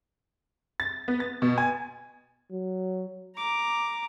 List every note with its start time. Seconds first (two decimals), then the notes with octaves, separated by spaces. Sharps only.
0.80 A6
1.08 B3
1.20 A6
1.42 B2
1.58 G#5
2.51 F#3
3.37 A#5 D6